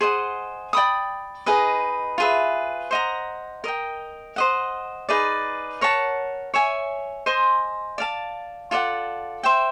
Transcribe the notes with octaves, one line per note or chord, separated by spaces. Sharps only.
G#4 C5 D#5 F#5
D5 G5 B5 D#6
D#4 G#4 B4 D#5
F4 G#4 B4 E5
C5 D#5 F#5 A#5
A#4 D#5 G5
C5 D#5 F#5
D#4 G#4 B4 D5
A#4 C#5 F#5 A5
C#5 E5 G#5
C5 D#5 G#5 C6
D5 F5 A5
F4 A4 D5 F#5
C5 E5 G5